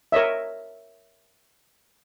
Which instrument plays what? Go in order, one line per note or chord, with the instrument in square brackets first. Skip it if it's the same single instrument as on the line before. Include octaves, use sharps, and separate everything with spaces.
[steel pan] A#4 C#5 D#5 E5